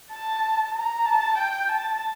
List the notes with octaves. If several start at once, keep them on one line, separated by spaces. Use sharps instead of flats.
A5
A#5
A5
G5
A5